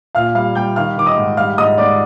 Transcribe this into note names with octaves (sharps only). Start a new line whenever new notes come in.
A#2 F5 F6
G3 F5 F6
G3 G5 G6
D#3 F5 F6
D#3 D6
D#5 D#6
G#2
G3 F5 F6
G#2 D#5 D#6
G#2 D5 D6